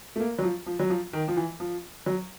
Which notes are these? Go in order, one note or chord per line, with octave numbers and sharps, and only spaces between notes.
A3
A#3
F#3
F3
F3
F#3
F3
D#3
F3
E3
F3
F#3